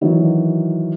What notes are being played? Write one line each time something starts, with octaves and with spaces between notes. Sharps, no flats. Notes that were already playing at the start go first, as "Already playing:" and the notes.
D#3 E3 F#3